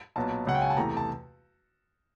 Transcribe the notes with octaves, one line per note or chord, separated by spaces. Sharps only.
B1 A#2 F#3 B3 A5
C#2 C#3 F#3 F#5
G5
G#5
A5
E2 C3 E3 A3 A#5
A5